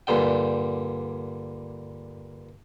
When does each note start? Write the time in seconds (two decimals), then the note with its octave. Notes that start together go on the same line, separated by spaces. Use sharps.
0.07 G2 A#2 D3 G5